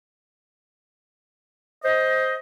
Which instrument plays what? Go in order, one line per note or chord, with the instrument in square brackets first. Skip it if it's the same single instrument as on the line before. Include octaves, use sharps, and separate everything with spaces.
[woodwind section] C5 D#5